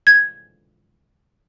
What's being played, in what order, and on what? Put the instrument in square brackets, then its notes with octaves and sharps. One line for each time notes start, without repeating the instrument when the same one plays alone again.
[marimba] G#6